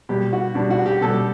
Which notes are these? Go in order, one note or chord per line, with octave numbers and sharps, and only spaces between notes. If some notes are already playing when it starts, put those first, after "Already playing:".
B2 G3 G4
F#4
B2 G3 D4
F#4
G4
B2 G3 A4